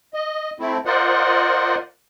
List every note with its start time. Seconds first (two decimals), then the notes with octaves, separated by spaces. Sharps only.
0.14 D#5
0.59 A3 C4 E4
0.86 F4 A#4 C5 D5 D#5 F#5